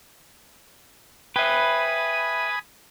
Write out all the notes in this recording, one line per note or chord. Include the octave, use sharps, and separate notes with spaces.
B4 E5 G5 G#5 B5 D#6